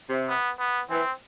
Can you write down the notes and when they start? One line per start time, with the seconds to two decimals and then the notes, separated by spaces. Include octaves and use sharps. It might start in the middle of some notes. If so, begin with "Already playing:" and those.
0.08 C3
0.29 B3
0.59 B3
0.90 E3 C4